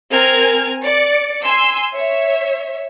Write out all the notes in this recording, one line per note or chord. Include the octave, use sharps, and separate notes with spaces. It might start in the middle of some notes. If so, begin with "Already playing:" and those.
C4 A#4 G#5 F6 G#6
D5 C#7
G#5 C6 E6
C#5 E5